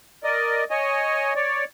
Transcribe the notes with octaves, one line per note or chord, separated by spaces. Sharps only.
A#4 D5 D#5
C#5 D#5 G#5
C#5 D5